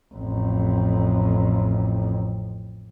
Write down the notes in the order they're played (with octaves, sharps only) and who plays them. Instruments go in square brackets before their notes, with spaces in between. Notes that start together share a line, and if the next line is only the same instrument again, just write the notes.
[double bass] A1 F2